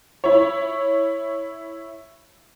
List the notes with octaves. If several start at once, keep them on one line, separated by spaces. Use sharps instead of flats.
E4 C#5